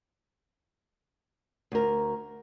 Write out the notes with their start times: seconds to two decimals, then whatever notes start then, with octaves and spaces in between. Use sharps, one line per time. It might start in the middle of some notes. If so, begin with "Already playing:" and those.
1.72 D2 A#4